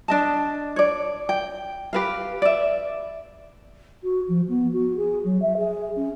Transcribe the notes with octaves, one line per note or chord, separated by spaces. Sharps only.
D4 D#5 A5
C#5 D5
G5
G4 B4 F5
D5 E5
F#4
F3
B3
F#4
G#4
F#3
E5
G#4
C#4